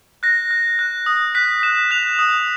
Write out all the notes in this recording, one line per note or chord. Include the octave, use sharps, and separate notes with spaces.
F#6 A#6
F#6
F#6
D#6
F#6 B6
F#6 E7
F#6 F7
D#6